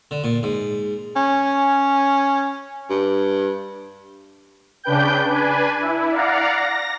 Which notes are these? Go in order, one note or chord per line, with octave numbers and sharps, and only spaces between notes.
D3
A#2
G#2
C#4
G2
C#3 D4 B4 G5 G6
D4 B4 G#5
E4
D5 F5 F#5 A#5
A#6